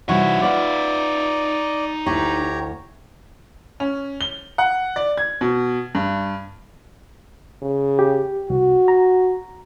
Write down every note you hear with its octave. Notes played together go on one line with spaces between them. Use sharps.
C3 E3 G3 D#4 F#4 C#5 E5
F4 B4 D5 F#5
D2 E4 G4 C#5 A#5
C#4
G7
F#5
D5
G#6
B2
G2
C#3
G4
C2 F#4
A#5